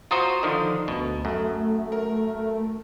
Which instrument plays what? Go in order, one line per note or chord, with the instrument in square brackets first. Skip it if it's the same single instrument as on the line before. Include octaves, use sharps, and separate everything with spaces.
[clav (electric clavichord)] F4 F#4 C5 [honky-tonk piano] A#5 D#6
[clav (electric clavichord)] D3 D#3 F3
[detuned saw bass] D2 [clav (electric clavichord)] B2
[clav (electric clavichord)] F#2 [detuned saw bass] A3
[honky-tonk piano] A#4